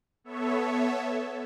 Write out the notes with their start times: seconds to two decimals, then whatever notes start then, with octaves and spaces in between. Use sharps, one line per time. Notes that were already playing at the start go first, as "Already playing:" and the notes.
0.24 B3 A4 C#5 E5